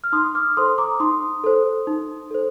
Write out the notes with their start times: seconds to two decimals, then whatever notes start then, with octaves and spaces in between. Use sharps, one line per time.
0.04 F6
0.13 D#4 C6 D#6
0.35 D6 F6
0.57 A4 C5 C6 D#6
0.78 A#5 D6
1.00 D#4 C6 D#6
1.44 A4 C5
1.87 D#4
2.31 A4 C5